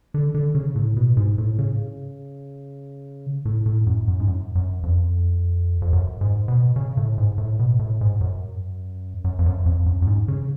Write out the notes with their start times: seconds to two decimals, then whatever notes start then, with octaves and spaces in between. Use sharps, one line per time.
0.14 D3
0.34 D3
0.55 C#3
0.76 A2
0.97 B2
1.17 G#2
1.38 A2
1.59 C#3
3.45 A2
3.66 A2
3.87 F#2
4.08 F#2
4.20 G#2
4.27 F#2
4.55 F#2
4.83 F2
5.82 F2
5.93 F#2
6.21 G#2
6.48 B2
6.76 C#3
6.97 A2
7.18 G#2
7.38 A2
7.59 B2
7.79 A2
8.01 G#2
8.21 F#2
9.24 F#2
9.39 F2
9.46 F#2
9.66 F2
9.86 F#2
10.02 F#2
10.07 G#2
10.28 C#3